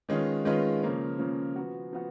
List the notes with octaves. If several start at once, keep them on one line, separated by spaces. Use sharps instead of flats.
D#3 G#3 C#4 F4 B4
D#3 G#3 C#4 F4 B4
C#3 F3 A#3 C#4
C#3 F3 A#3 C#4
F3 B3 F#4
F3 B3 F#4